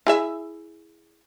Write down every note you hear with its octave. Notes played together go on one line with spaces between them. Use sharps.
E4 G#4 E5